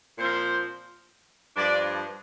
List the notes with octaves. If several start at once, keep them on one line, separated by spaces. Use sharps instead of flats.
A#2 F3 C4 C5
G2 F3 D4 D5